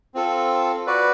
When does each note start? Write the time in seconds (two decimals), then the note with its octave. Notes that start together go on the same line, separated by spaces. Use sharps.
0.14 C4 F4 A4
0.87 F#4 B4 D5